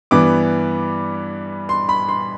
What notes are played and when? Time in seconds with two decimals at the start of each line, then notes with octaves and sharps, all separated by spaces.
0.11 G2 E3 B3 D6
1.69 C6
1.89 B5
2.09 C6